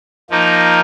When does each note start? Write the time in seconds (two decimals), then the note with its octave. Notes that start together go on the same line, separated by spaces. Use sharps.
0.30 F3 A#3 D#4